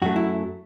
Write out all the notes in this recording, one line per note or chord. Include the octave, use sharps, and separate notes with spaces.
F#2 F#3 A3 F#4
E4